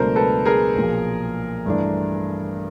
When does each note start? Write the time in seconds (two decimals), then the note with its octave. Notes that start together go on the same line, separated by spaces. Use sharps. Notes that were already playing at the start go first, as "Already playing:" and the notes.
Already playing: C#2 B2 F#3 A3 D4 A#4 C5
0.16 A4 B4
0.45 G#4 A#4
0.75 B1 A#2 F3
1.66 G2 E3 A3 D4